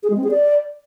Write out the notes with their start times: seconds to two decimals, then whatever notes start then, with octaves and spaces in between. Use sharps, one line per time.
0.03 G#4
0.10 G#3
0.17 C4
0.24 G#4
0.31 D5